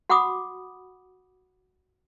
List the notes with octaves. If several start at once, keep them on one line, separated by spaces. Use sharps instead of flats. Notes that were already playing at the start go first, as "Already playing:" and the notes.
F#4 F#5 B5 D6 D#6